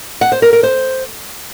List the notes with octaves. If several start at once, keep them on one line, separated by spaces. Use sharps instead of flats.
F#5
C5
A#4
A#4
C5